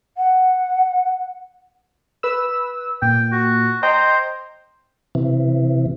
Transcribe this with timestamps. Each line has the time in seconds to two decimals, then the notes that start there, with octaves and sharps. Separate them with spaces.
0.17 F#5
2.23 B4 E6
3.02 A#2 G5
3.32 F#4
3.83 C5 D#5 G5 A#5
5.15 C3 E3